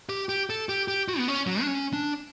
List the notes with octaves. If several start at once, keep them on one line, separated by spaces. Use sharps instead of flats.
G4
G4
A4
G4
G4
F#4
B3
C#4
F#3
D4
C#4
D4